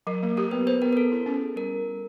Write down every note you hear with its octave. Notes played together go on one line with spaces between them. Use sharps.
F#3 A#4
A#3
G4 A#4
B3 B4
B4 C5
B3 A#4
A#4
C4 A4
E4
C#4
G#4
G3 A#4